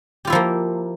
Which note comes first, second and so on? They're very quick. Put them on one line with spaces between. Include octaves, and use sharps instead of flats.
G4 F4 E4 F3 A#3